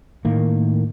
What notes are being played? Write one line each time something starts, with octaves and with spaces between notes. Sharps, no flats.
A2 D#3 A#3